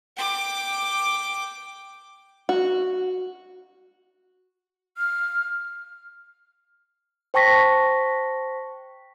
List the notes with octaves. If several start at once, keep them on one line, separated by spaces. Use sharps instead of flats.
G5 D6
F#4
F6
C5 G5 A5 C#6 A#6 B6